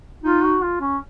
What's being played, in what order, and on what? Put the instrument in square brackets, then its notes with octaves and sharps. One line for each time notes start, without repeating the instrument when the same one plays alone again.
[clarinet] D#4 [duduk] F4
[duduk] F#4
F4
C#4